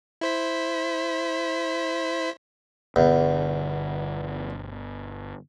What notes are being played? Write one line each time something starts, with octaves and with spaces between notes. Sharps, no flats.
E4 C5 B6
G1 E2 B2 D3